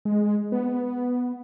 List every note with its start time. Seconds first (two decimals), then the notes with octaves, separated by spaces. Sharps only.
0.05 G#3
0.52 B3